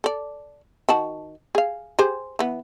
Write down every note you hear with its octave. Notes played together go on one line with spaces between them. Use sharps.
A4 D5
D#3 F#4 A5
G#4 F5
G4 G#4 C5
E3 B3